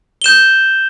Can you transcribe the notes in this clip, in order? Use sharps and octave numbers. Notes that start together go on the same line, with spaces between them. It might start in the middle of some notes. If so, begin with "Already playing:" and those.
G6 E7 G7